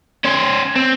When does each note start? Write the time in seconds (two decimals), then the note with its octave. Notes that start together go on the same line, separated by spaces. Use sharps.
0.24 C#4 C5
0.76 C4